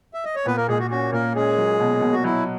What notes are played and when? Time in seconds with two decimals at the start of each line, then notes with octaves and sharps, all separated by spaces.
0.14 E5
0.25 D#5
0.35 C#5
0.46 A#2 B3 B4
0.57 A#3 A#4
0.68 A#2 G#3 G#4
0.80 F#4
0.91 C#4 F#4
1.12 A#2 A#3 A#4
1.35 G#3 C#4 G#4
1.58 F#3
1.80 B2
2.01 B2
2.13 F#4
2.24 F#3 E4